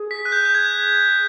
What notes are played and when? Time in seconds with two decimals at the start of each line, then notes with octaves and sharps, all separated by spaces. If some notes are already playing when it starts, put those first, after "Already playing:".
Already playing: G#4
0.11 B6
0.25 F#6
0.32 G6
0.45 G6
0.55 G#6